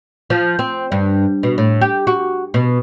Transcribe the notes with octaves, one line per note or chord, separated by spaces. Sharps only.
F3
C4
G2
B2
A2
G4
F#4
B2